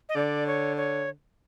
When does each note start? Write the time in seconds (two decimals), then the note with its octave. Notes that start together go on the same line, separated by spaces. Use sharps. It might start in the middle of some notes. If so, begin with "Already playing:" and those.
0.09 D#5
0.15 D3 D5
0.47 C#5
0.77 C#5